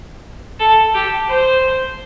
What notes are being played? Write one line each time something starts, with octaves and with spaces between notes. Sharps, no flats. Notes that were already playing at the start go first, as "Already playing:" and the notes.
A4
G4
C5